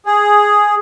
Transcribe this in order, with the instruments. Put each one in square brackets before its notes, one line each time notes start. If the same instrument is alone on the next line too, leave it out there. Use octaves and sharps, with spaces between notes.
[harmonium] G#4